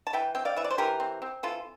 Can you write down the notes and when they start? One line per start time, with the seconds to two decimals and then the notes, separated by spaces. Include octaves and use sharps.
0.07 A5
0.13 E3 E5 G5
0.35 C4 G5
0.45 D5 F5
0.56 E3 E5
0.64 D5
0.71 C5
0.78 E3 G4 A#4
1.00 C4
1.22 C4
1.43 E3 F4 A4